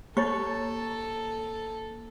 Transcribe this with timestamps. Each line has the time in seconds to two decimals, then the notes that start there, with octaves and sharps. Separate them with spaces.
0.17 A#3 A4 C#5 A#5 A6